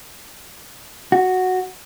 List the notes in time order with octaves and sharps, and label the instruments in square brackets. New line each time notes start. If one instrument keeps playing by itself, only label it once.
[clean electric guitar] F#4